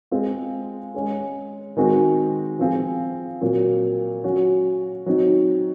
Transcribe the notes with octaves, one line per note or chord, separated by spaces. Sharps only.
G#3 C4 F4 G#4
G#3 C#4 G#4
D#3 G#3 C4 F#4
F3 C4 F4 G#4
A#2 F#3 C4
F#3 C#4 F#4
F#3 C4 D#4